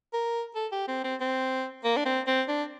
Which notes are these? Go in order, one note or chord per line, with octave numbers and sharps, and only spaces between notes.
A#4
A4
G4
C4
C4
C4
A#3
D4
C4
C4
D4